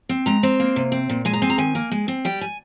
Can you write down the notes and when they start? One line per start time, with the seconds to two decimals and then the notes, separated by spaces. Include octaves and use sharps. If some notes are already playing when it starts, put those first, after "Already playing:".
0.09 C4
0.26 G#3 A#5
0.43 C4
0.60 A#3
0.76 C3
0.92 C4
1.10 A#2
1.25 G#3 G#5
1.33 A#5
1.42 C4 G#5
1.50 A#5
1.58 D#3 G#5
1.75 A#3
1.92 G#3
2.08 C4
2.25 G3 G5
2.41 G#5